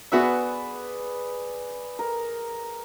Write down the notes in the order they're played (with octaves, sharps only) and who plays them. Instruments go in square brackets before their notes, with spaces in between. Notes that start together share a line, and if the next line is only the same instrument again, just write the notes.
[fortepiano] B3 F#4 E5 [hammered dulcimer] G#4 B4 D5
[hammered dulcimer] A#4